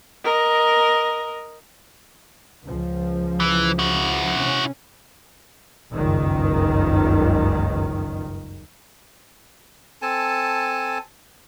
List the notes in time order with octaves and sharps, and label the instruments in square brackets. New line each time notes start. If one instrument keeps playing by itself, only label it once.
[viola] A#4 D#5
[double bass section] C#2 F3
[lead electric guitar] E3
E4 F#4
[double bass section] C3 C#4
F#1 C#2 G2 D#3
[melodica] C4 A4 G#5 A5